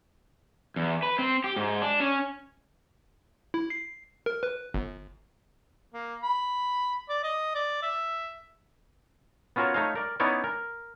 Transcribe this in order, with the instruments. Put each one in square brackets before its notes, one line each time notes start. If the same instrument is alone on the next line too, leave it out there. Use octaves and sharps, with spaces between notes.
[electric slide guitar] E2
B4
C4
G4
G#2
D4
C#4
[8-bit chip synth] E4
C7
A#4
B4
G1
[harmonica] A#3
B5
D5
D#5
D5
E5
[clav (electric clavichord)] B3 C#4 F4 F#4 A#4 C#5
A3 D#4 C#5 D#5 F5
A#4 D5
B3 C#4 D#4 E4 C#5 D5
A#4